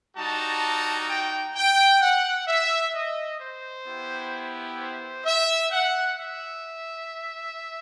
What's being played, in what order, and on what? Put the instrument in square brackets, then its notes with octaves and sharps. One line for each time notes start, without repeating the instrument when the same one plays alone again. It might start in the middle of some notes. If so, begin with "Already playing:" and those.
[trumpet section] G3 D#4 F#4 A5
G5
G5
F#5
E5
D#5
C5
B3 E4 G4
C5
E5
F#5
E5